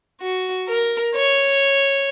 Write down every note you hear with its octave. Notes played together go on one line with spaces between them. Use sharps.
F#4
A#4
C#5